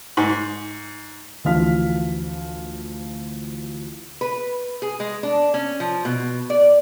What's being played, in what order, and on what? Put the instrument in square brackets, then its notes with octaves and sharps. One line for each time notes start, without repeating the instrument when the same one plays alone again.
[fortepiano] G#2
[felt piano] D2 E3 F3 F5 F6 B6
[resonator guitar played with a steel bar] B4
G#4
G#3
D4
C#4
F3
B2
D5